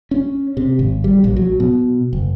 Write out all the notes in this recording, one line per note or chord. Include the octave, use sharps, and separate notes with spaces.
C#4
C3
G#1
G3
A#1
F#3
B2
F#1